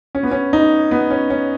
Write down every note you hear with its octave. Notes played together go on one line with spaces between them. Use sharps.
C#4
B3
C#4
D#4
B3
C#4
C#4